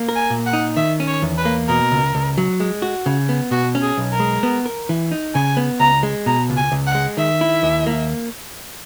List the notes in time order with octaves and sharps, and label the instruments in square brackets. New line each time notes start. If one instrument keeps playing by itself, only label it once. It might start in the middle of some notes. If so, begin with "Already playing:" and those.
Already playing: [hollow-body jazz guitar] A#3
A#4
[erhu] G#5
[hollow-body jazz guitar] A#2
[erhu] F#5
[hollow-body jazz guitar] D#4
[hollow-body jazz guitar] D#3 [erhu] E5
[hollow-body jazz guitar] C#4
[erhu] C#5
[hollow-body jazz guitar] E2
[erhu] B4
[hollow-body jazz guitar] A#3
[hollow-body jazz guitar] B2 [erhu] A#4
[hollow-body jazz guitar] C#2
C#2
F#3
G#3
F#4
C#3
B3
[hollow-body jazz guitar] B2 [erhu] F#4
[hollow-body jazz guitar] C#4
[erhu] G#4
[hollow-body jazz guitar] B1
[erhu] A#4
[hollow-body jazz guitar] G#3
B3
A#4
E3
D#4
[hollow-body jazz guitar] C#3 [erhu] G#5
[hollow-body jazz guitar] B3
[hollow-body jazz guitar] C#2 [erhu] A#5
[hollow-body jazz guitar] G#3
[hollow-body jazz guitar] B2 [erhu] A#5
[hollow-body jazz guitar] C#2
[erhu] G#5
[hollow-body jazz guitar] C#2
[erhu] F#5
[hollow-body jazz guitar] G#3
[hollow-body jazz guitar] D#3 [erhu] E5
[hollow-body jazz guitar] E4
D#2
A#3